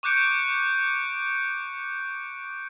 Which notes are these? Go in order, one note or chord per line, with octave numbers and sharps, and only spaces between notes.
C#6 D6 F#6 G6 C#7 D7